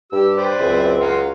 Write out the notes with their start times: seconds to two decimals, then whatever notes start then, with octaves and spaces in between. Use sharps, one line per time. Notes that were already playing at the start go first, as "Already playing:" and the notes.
0.12 G2 G4 E6
0.37 B4 C5 D5
0.59 C#2 F#2 C4 E5
1.00 F#3 F5 F#5 C6